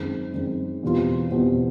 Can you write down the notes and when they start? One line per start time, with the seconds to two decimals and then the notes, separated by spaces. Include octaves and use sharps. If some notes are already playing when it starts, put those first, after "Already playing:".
Already playing: F#2 D#3 G#3 C4
0.34 F#2 D#3 G#3 C4
0.83 E2 B2 G3 C4 F4
1.31 E2 B2 G3 C4 F4